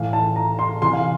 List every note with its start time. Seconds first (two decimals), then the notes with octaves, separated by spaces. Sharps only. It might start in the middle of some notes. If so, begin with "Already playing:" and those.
Already playing: A2 E3 F5
0.13 A5
0.36 A#5
0.59 C6
0.82 C3 E3 C6
0.93 F5